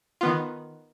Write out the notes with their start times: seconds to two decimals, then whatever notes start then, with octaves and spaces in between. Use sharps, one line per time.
0.21 D#3 B3 F4